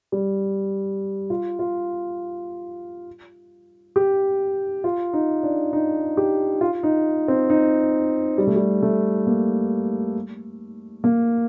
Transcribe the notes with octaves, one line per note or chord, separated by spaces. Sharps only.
G3
F4
F4
G4
F4
D#4
D4
D#4
G4
F4
D#4
C4
D#4
G3
A3
G3
A3
A#3
A#3